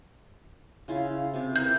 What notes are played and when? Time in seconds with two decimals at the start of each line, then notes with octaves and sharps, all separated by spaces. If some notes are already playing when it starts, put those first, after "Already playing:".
0.88 C#3 E4 F4
1.33 C3 G4
1.56 E4 A#4 B4 G6